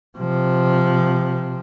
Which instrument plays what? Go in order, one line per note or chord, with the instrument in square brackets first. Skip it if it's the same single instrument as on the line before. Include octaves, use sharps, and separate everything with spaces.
[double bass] C3 F3